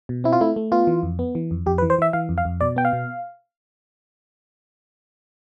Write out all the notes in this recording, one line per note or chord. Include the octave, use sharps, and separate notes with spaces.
B2
C4 E4
F4
A3 E4
A3
B3 F4
E3
F2
B3
E3
F2
F2 G4
B4
E3
C5
E3 E5
E3 F5
F2
F5
F2
B2 D5
B3 G5
F5
B2